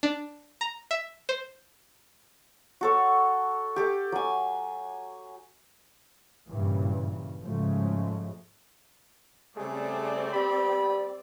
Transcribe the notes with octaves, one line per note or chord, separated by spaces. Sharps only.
D4
A#5
E5
C5
F#4 A4 C#5
G4 A4 D6
F#3 G#5
G2 A#2 C#3 E3 F#3
G#2 C#3 F3 F#3 G#3 A3
C#3 G3 A3 C4 G#4 D5
G3 B3 G4 B5